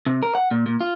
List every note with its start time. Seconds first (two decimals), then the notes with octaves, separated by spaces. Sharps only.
0.06 C3
0.23 A#4
0.35 F#5
0.51 A#2
0.66 A#2
0.81 F4